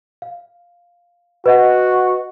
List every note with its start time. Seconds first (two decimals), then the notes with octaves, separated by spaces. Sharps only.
0.22 F5
1.46 F#4 B4 D#5 F#5